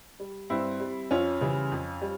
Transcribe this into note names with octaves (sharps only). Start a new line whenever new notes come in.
G3
G2 C4 E4
G3
F2 C#4 F4
C#3 E3 G3
F2
G3